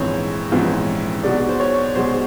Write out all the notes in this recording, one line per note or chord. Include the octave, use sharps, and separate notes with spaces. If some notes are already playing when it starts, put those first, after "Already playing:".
Already playing: A#1 G#2 E3 G#3 C4 C#5
A#1 G#2 E3 G#3 C4
B1 B2 G#3 D5
C5
C#5
B1 B2 G#3 C5